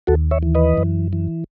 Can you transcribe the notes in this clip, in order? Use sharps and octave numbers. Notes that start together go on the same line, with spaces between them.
D#2 F#4 A4
C#5 E5
E3
B4 D#5
F#2
E3